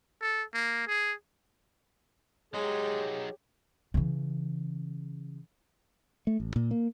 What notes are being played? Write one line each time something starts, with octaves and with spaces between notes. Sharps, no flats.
A4
A#3
G#4
F#3 G#3 D#4 G4 G#4 C#5
C#3 E3
A3
A1
A#2
A#3